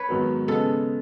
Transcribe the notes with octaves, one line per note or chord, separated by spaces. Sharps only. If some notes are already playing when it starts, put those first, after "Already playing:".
Already playing: B4 C#5
G#2 D#3 F#3 B3
C#3 G#3 B3 A4